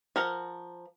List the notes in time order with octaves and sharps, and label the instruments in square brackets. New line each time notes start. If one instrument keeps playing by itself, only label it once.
[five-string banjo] F3 A#4 F#5 A#5